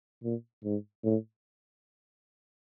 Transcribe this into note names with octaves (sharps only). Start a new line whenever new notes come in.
A#2
G#2
A2